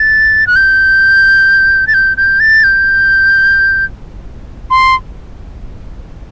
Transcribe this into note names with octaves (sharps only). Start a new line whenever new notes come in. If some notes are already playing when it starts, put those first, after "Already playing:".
Already playing: A6
F#6
G6
A6
G6
G6
A6
G6
C6